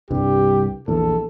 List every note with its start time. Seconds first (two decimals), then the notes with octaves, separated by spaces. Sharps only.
0.11 C2 G2 G4
0.88 A#1 E2 A4